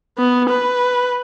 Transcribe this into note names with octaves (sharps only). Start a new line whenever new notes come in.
B3
B4